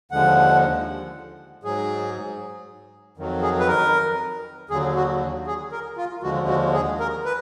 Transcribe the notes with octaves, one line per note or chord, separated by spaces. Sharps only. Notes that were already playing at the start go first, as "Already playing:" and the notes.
D#2 D3 F3 G#3 F#5
G#2 F#3 G#4
F2 D#3 F#3
G#4
B4
A#4
D#2 D3 F#3 G#4
F#4
G#4
A#4
F4
D#2 D3 F3 G#3 F#4
F#4
G#4
A#4
B4